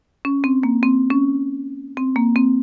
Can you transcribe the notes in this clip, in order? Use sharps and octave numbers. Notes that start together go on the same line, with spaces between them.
C#4
C4
A#3
C4
C#4
C4
A#3
C4